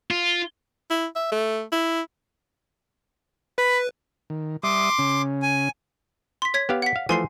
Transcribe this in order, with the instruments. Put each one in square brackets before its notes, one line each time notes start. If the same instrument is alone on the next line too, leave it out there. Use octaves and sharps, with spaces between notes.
[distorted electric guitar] F4
[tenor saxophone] E4
E5
A3
E4
[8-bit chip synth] B4 [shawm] B5
[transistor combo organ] D#3
[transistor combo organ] G3 E5 D#6 [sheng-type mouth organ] C6 D6
[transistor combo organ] C#3 C#4
[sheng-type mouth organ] G#5
[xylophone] C6 B6
C#5 G#6 B6
[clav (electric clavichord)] B3 G4 F5
[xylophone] F#5 B6
[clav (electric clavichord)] F5
[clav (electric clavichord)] E3 F3 A3 [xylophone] G#5 C6 C7